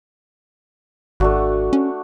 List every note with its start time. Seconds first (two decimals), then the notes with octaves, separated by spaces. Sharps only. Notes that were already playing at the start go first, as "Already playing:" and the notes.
1.20 G#1 A3 D4 F#4
1.73 C#4